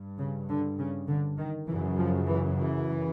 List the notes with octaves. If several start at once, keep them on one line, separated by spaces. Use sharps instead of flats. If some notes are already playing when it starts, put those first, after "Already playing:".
Already playing: G2
C#3
D3
C#3
D3
D#3
F#2 C#3 E3
F3
E3
E3